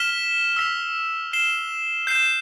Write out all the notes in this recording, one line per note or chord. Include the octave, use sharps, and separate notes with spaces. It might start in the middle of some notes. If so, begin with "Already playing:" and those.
Already playing: F6 B6 E7 G7
E6 B6 F7
F6 C7 E7 G7
G6 C7 E7